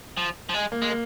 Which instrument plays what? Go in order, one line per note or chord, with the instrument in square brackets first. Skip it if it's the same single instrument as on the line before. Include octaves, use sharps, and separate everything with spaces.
[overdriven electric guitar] F3
F3
G#3
[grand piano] A#3
[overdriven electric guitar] G#3
[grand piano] A#3